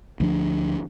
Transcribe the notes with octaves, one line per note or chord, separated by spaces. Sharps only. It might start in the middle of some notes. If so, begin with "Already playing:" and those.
D2 F3 D4